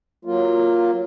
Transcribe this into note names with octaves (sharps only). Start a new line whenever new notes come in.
F#3 A#3 F4